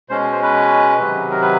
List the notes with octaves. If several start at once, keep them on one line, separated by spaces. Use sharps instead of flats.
B2 G#3 C#4 C5
C5
B4
C3 D#3 F#3
A#4
B4